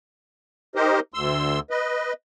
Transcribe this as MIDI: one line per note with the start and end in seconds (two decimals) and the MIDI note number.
0.75 1.00 63
0.75 1.00 67
0.75 1.00 70
0.75 1.00 72
0.75 1.00 75
1.14 1.59 38
1.14 1.59 84
1.14 1.59 88
1.70 2.13 71
1.70 2.13 75